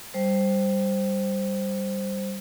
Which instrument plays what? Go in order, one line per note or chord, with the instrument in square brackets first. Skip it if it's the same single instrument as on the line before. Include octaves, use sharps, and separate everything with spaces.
[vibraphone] G3 C5